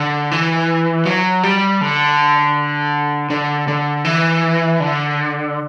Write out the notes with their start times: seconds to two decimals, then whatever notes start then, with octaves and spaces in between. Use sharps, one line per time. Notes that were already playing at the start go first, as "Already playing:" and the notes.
Already playing: D3
0.31 E3
1.06 F#3
1.43 G3
1.81 D3
3.30 D3
3.68 D3
4.05 E3
4.80 D3